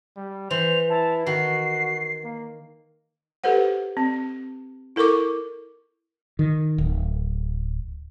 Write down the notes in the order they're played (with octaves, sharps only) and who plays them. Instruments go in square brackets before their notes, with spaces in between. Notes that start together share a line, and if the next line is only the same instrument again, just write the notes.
[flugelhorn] G3
[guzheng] E3 [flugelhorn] C5 [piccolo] F7
[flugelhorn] E4 [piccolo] A5
[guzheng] D#3 [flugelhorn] F#4 [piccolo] C7
[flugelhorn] A#3
[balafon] G4 A4 B4 C5 F#5
C4
E4 A4 A#4 C#6 D6
[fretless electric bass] D#3
D1